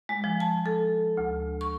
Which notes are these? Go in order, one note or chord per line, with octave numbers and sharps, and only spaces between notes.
G#3
F3
A5
A4
D2
C#6